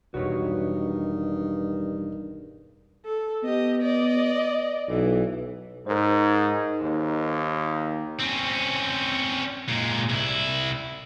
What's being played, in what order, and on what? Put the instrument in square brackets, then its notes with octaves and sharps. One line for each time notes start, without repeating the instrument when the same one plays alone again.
[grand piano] E1 [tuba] G2 [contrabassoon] D#3 [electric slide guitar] F#4 B4 C#5
[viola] A4
[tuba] B3 [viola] G4 D#5
[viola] D5 D#5
[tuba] B1 [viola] E3
[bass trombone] G#2 [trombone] D#4 [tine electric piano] A#4 C5
[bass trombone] D#2
[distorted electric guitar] C4 C#4
A#2 G#3
C2 E4